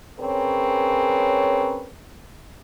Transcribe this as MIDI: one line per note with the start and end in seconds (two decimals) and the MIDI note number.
0.20 1.89 60
0.20 1.89 61
0.20 1.89 68
0.20 1.89 70
0.20 1.89 71
0.20 1.89 73